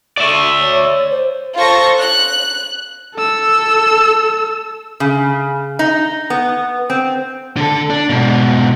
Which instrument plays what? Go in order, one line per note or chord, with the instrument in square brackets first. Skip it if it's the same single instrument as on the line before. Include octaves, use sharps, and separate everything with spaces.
[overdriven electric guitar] D5 E5
[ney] C#5
C5
[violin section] F4 A4 C5 C#6 A#6
F#6
[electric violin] A4 E6
[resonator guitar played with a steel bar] C#3
D#4
B3
C4
[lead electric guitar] D3 A4
D4
G#2 B2